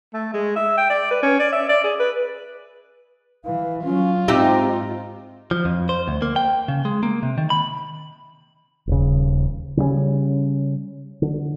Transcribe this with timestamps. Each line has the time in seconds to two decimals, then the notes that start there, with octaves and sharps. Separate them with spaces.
0.14 A3
0.33 G#3
0.56 E5
0.77 G5
0.90 D5
1.11 B4
1.23 C#4
1.39 D5
1.52 E5
1.69 D5
1.84 G#4
1.99 B4
3.45 E3 F5
3.84 F#3 C#4 F4
4.28 G#2 C4 D#4 G4 E5
5.51 F3
5.65 F2
5.89 C5
6.08 D2
6.22 A#3
6.36 G5
6.68 C#3
6.85 G#3
7.03 A#3
7.23 C3
7.38 D#3
7.50 B5
8.87 D#1 C#3
9.77 C#3 G3 A3 C#4
11.22 D3